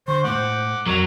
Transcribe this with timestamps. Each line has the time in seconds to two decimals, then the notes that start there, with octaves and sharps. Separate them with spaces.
0.08 D3 C5 C#6
0.24 A2 G#3 C5 F#5 D6
0.86 F2 F#3 A#4